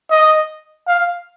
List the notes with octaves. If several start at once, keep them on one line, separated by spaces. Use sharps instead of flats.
D#5
F5